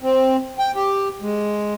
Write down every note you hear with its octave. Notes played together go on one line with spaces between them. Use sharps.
C4
G5
G4
G#3